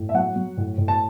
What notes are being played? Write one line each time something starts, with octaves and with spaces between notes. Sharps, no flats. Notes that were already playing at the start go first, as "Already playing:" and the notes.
Already playing: A2
E5
F#3 F#5
F#3
A2
A2
A5